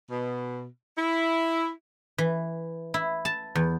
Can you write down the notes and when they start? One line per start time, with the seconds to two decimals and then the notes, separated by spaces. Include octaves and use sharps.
0.11 B2
0.98 E4
2.18 E3
2.94 E4
3.25 A5
3.55 E2